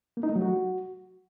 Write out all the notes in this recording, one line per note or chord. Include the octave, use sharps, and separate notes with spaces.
A#3
D#4
A3
F#3
F#4